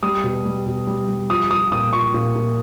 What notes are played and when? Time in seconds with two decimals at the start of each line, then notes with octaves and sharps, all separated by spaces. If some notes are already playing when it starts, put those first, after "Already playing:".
0.03 G3 D#6
0.24 B2
0.45 G3
0.66 B2
0.87 G3
1.08 G3
1.30 F3 D#6
1.50 F3 D#6
1.72 A#2 D#6
1.93 F3 C#6
2.14 A#2
2.35 A#2